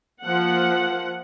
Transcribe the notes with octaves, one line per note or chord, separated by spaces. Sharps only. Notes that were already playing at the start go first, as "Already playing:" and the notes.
F3 A#3 F#5